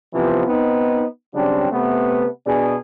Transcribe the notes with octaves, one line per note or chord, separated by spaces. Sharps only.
C3 E3 F3 B3
B3 C4 D#4
C#3 F#3 G3 C4 D4
C3 A3 B3
B2 D4 G#4